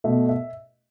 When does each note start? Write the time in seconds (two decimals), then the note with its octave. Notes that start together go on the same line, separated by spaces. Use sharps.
0.04 B2 A3 E5
0.29 E5